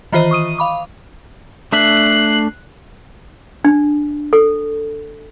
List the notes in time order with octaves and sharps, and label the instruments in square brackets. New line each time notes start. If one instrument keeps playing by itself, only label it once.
[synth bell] D#3 E3 F4 C5 D#5
C#6 D#6 D#7
F5 B5 D6
[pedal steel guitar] A3 D4 E5 [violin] F#6 C7
[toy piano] D4
A4